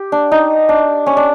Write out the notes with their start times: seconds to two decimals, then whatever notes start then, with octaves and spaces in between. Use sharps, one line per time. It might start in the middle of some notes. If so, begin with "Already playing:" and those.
Already playing: G4
0.12 D4
0.32 D#4
0.69 D4
1.06 C#4
1.17 D4